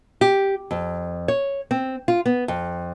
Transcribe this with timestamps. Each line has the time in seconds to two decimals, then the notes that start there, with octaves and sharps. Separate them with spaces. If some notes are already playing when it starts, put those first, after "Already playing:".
0.21 G4
0.71 F2
1.28 C#5
1.71 C4
2.08 F4
2.26 B3
2.48 F2